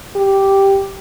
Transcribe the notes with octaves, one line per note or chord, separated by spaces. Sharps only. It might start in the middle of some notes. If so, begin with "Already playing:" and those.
G4